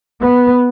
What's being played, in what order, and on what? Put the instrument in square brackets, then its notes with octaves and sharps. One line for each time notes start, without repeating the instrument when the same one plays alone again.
[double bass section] B3